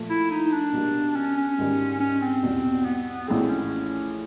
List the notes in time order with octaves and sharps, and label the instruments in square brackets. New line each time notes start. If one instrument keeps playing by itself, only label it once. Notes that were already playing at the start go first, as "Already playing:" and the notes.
Already playing: [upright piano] A#2 F3 A3
[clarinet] E4
D#4
D4
[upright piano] B2 G3 A#3
[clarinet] C#4
C#4
[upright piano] G#2 D#3 G3
[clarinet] C#4
C4
[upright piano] E2 B2 G3
[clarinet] B3
[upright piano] A#1 A2 E3 G#3 [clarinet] C4
[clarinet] C#4